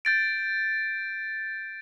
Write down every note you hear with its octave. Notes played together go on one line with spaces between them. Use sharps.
G6 A6 D7